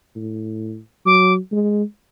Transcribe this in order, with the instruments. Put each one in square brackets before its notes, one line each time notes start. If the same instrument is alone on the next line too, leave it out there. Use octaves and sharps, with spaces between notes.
[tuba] A2
[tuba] F#3 [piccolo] D6
[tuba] G#3